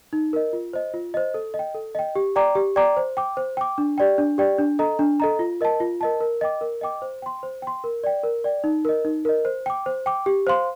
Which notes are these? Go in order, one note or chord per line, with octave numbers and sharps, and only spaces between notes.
D#4
A#4 D#5
F4
C5 D#5
F4
C5 D#5
A4
D#5
G5
A4
D#5 G5
G4
D5 G5 A#5 D6
G4
D5 G5 A#5 D6
C5
G5 D6
C5
G5 D6
D4
G4 D5 G5
D4
G4 D5 G5
D4
A4 D#5 A#5
D4
A4 D#5 A#5
F4
A#4 D#5 A5
F4
A#4 D#5 A5
A#4
D#5 G5 D6
A#4
D#5 G5 D6
C5
G5 C6
C5
G5 C6
A#4
D5 G5
A#4
D5 G5
D#4
A#4 D#5
D#4
A#4 D#5
C5
G5 D6
C5
G5 D6
G4
C5 F5 C6